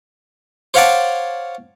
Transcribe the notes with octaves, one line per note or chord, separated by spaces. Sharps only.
C5 C#5 F5 F#5 A5 D6